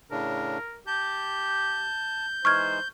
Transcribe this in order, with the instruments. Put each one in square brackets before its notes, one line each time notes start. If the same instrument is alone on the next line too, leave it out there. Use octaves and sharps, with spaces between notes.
[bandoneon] A2 C#3 D4 [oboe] A#4
[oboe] G4 [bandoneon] A5 [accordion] G6
[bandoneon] E3 G#3 D#4 [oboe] C5 [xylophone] C#6 F6 G#6